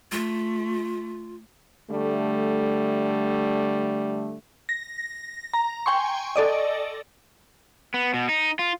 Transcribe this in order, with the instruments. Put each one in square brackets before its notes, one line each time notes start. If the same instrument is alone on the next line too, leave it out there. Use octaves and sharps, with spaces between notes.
[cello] A3 [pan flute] F4
[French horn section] D3 G3 A3
[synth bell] A#6
A#5
G5 G#5 C6 C#6
A4 D5 D#5
[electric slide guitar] B3
B2
D#4
F4